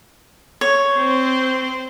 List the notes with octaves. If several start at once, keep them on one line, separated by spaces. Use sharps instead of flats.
C#5
C4 C5